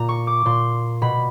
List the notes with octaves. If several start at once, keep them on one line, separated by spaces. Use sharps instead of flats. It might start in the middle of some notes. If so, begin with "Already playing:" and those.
Already playing: A#2 A#5
C#6
D6
A#2 C6
B2 B5